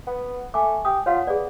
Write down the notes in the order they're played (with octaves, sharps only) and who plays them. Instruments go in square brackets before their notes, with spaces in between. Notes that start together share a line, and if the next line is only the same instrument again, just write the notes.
[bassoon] B3
[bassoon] A3 [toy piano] G#5 D6
[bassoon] G4 [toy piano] D#6
[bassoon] F4 [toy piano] C#5 F5 F#5
[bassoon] B3 [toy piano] G#4 D5